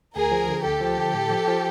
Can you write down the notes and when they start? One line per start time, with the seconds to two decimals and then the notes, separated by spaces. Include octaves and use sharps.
0.15 D2 G#4 A#4
0.31 F3
0.49 D3
0.65 D2 G4 A4
0.81 F3
0.98 D3
1.14 A2
1.30 F3
1.48 F3